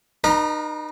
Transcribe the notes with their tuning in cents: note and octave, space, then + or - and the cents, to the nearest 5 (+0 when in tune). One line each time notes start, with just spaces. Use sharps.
D#4 -30 B4 -45 A#5 +0